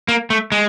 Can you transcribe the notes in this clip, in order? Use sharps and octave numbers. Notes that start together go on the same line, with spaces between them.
A#3
A3
G#3